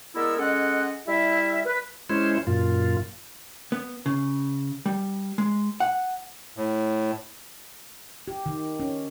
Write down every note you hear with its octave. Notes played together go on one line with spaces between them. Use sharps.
G#3 B3 E4 A#4 D5 E6
G#3 C#4 A4 D#5 F#5
G3 E4 E5
B4
G#3 C#4 E4 C5
F#2 A#2 F4
B3
C#3
G3
G#3
F#5
A2
G4
D#3
C#4